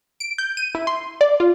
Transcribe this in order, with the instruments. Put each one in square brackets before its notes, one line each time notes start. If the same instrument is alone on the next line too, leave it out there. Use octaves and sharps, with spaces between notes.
[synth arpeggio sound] D7
G6
D#7
E4
C6
D5
F4